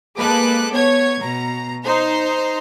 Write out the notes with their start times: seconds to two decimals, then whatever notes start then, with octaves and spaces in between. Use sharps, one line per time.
0.18 G#3 A#3 A4 B4 D6 F#6
0.71 B3 C#5 G#6
1.20 B2 A#5
1.85 D#4 C5 A#5 C6